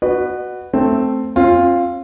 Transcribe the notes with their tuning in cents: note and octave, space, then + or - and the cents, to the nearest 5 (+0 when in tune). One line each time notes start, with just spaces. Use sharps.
F#4 +0 B4 +0 D#5 -45
A3 +0 C4 +0
C4 +45 F4 +0